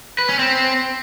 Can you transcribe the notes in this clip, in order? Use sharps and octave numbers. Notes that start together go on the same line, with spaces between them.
B4
C#4
C4